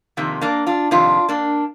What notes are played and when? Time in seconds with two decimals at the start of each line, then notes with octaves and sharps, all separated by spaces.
0.17 F2 C3 D#3 A#3
0.41 A#3 D4
0.66 D4 F4
0.91 F2 C3 D#3 D4 F4
1.29 A#3 D4